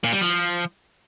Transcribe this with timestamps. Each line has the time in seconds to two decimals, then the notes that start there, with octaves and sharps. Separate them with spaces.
0.04 A#2
0.13 G3
0.21 F3